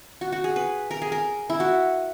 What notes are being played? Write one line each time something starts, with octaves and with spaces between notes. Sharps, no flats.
F#4
F#4
G#4
B4
A#4
G#4
A#4
E4
F#4